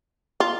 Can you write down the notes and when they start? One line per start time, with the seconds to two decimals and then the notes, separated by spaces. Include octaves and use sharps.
0.40 F4